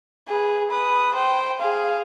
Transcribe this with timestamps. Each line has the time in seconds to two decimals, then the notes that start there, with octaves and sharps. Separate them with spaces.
0.28 G#4 B4
0.71 B4 D#6
1.14 C5 G5
1.60 G#4 F5